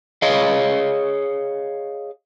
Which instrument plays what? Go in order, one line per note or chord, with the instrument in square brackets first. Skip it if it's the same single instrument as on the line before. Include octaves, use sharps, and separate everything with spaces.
[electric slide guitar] G#4 C#5 D#5 F5